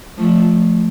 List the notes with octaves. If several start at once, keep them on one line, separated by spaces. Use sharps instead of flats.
F3 A3